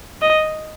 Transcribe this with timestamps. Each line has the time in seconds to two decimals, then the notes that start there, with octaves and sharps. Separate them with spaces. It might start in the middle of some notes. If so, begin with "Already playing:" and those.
0.22 D#5